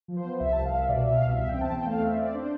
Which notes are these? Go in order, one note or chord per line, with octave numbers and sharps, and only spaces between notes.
F3
C5
B3
C2 E5
C2 A5
F5
C2 E5
B2 D5
B2 E5
F5
C2 E5
E2 E5
G5
C4
A5
E2 G5
A3 F5
C4 E5
C4 D5
D4 C5